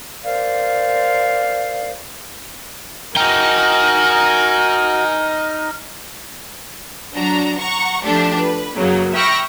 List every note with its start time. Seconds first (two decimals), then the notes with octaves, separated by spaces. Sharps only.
0.24 A#4 C5 D5 F5
3.17 D#4 F#4 A#4 G5 G#5 F6
7.14 F#3 D4 F#4 A#5
7.58 F#5 A#5 C#6
8.04 F3 A3 D4 G4 A4
8.37 B4
8.76 F#2 C#3 F#3 A#3
9.14 E5 G5 B5 C#6 F6 A#6